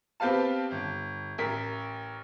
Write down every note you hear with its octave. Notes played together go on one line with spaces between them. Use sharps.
B3 C4 G4 B4 F5 A5
G1
A1 A#4 B6